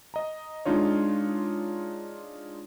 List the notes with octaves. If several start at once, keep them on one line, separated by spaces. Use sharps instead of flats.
D#5 A#5
G#3 D4 D#4 F4 C#5